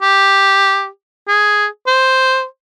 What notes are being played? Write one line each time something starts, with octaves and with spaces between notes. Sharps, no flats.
G4
G#4
C5